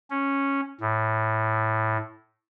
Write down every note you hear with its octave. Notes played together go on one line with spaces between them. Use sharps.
C#4
A2